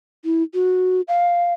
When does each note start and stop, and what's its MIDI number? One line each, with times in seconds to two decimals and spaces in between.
0.25 0.43 64
0.54 1.01 66
1.08 1.54 77